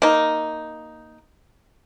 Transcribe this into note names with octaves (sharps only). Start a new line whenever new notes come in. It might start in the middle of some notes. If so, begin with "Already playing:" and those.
A#3 D#4